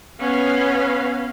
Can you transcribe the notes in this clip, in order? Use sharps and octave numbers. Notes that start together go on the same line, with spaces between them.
B3 C#4 F5